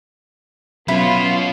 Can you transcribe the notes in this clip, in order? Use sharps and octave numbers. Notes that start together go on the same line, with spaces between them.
B2 F#3 B3 C#4 E4 F4 B5